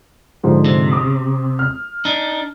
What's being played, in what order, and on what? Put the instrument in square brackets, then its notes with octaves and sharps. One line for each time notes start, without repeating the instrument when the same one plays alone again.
[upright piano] G#2 D3 F3
[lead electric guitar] C3
[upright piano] D6 D#6
F6
[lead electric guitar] D4 D#4